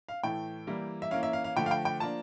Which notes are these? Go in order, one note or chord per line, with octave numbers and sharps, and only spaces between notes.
F5
A2 E3 A3 G5
E3 G3 A#3 E4
E5
E3 A#3 C#4 F5
E5
F5
F5
D3 F3 A3 G5
F5
G5
G5
F3 A#3 D4 A5